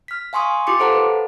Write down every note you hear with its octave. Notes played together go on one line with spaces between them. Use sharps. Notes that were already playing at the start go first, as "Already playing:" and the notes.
F6 B6
F5 G#5 C6 C#6 D#6
F4 G4 C6 D6 C#7
A4 C5 F5 F#5 A5 A#5
B4